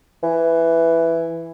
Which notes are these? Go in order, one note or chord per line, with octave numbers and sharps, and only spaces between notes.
E3